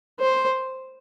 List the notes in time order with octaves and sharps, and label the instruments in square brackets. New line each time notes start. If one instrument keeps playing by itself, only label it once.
[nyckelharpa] C5